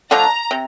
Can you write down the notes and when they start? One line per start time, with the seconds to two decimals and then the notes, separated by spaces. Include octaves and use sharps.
0.10 D3 F3 A3 D4 A#5
0.51 C3